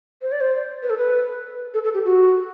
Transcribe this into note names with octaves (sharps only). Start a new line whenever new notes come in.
C5
D5
C5
B4
A4
B4
A4
A4
G4
F#4